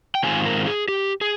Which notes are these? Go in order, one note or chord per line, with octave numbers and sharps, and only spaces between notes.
G5
G#2 D#3 G#3 C4 F4 G#5
A#4
G#4
G4
G#4